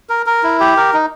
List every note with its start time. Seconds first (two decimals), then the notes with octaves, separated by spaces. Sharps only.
0.09 A#4
0.26 A#4
0.43 E4
0.60 G4
0.77 A#4
0.93 D#4